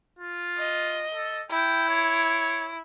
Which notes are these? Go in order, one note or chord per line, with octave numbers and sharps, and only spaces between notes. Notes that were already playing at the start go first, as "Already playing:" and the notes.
F4
D#5
A4
E4 G5
C#5